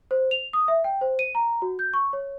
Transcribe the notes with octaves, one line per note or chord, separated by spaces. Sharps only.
C5
F7
D#6
E5
G5
C5
D#7
A#5
F#4
G6
C#6
C#5